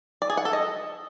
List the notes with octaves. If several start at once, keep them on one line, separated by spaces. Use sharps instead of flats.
D5
G#4
F#5
A4
D#5